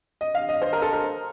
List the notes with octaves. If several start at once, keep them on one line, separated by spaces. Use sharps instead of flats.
D#5
F5
D#5
C5
A#4
A4
A#4